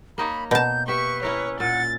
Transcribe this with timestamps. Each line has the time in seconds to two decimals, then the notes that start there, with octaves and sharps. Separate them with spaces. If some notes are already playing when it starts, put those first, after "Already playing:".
0.18 A#3 D#4 C#5 B5
0.51 B2 A5 G6
0.88 G4 B4 E5 C#6
1.23 C#4 E4 A#4 C#5
1.60 A#2 F#5 A6